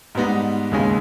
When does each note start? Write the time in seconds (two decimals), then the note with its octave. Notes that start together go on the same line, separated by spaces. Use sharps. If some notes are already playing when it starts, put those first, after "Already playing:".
0.15 G#2 G3 B3 D#4
0.71 D#2 C#3 G#3 D#4